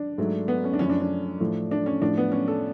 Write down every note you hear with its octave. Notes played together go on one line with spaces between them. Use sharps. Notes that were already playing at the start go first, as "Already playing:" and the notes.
Already playing: D4
G#2 F#3 A3
B3
C#4
D4
F#2 F3 A3 C#4
D4
D4
A2 F3 A3
D4
C#4
A2 F3 A3 D4
B3
C#4
A4